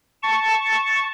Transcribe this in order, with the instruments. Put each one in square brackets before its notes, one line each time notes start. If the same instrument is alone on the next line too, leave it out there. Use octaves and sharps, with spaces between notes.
[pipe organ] A5 C#6